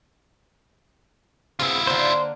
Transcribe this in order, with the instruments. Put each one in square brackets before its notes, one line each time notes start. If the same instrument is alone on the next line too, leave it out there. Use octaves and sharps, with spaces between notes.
[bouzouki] B3 C4 G#4 [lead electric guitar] E4 F4
[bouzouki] D3 A#3 [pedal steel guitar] C5